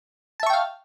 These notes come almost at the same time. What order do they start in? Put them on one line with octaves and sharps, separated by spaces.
A5 E5 C#6 G5 F5